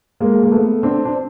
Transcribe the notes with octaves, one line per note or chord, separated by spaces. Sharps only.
G#3 A#3
A#3
A3 B3
C4 D4
D4